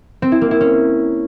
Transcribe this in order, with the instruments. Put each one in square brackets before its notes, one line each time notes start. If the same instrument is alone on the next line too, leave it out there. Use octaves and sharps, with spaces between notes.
[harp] C4
E4
A#3
E4
C#4